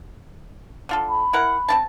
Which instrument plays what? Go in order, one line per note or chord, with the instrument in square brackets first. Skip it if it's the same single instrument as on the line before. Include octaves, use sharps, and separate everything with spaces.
[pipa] D3 F4 A4
[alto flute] B5
[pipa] E4 A#4 F#5
C4 E4 A5